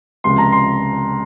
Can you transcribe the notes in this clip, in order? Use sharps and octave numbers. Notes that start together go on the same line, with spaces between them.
C#2 C3 F3 G#3 C6
A#5
C6